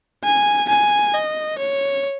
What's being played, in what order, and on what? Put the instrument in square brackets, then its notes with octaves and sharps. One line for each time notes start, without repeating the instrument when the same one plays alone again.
[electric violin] G#5
G#5
D#5
C#5